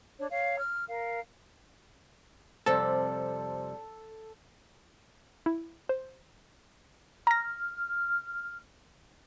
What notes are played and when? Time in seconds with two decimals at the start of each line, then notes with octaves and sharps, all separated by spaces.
0.18 D4 C#5
0.30 C#5 F5
0.60 F6
0.89 A#4 F5
2.66 F2 C3 G3 A4
5.46 E4
5.89 C5
7.27 A#5 F6 A#6